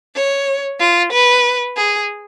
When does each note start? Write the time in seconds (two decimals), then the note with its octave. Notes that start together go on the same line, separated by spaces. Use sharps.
0.15 C#5
0.80 F4
1.12 B4
1.76 G#4